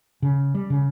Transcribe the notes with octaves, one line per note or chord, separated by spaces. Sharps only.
C#3
G3
C#3